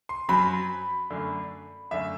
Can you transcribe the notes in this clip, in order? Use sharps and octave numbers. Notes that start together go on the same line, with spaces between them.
C6
F#2 F#3 C4 B5
F#2 D3 A3
F#2 D3 A3 E5